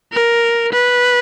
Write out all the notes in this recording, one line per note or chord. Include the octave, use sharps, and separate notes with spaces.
A#4
B4